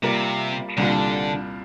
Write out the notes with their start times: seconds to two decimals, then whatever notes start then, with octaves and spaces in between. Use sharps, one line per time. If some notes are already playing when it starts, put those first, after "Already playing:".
0.03 C3 G3 A#3 F4 A#4 D5
0.77 C2 A#2 D3 G3 D4 F4